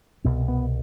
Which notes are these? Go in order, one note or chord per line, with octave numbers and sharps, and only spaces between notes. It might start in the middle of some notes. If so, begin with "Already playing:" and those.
C2 B2 B3
B3